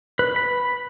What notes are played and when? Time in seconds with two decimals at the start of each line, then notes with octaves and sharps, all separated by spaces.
0.19 B4
0.36 B5